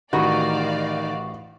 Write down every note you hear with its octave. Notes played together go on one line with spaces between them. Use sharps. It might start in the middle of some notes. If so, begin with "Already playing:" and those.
A1 D#3 F#4 G4 D5 D#5 F5 B5